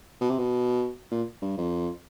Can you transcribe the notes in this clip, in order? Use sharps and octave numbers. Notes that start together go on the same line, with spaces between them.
B2
C3
B2
A#2
G2
F2